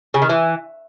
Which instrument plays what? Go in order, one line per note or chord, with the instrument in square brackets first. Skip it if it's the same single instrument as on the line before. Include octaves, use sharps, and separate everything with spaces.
[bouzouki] C#3
D#3
E3